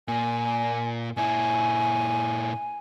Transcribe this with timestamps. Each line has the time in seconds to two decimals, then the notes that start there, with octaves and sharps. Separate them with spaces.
0.08 A#2 A#3 G#5
1.17 A#2 E4 G#5